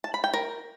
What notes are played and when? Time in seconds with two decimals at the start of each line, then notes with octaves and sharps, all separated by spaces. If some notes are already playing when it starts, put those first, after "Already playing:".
0.04 A5
0.14 B5
0.24 G5
0.34 A#4